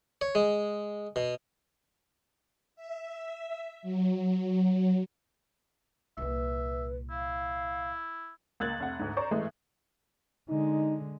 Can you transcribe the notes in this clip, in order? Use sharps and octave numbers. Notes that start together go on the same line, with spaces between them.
C#5
G#3
B2
E5
F#3
C2 A#2 B4 E5
E4 F5
C#2 A#3 F#6 G#6 A6 F#7
F1 F#5
D2 G#2
C5 D5 A#5 C#6
A1 E3 G#3 A3
D3 G#3 D#4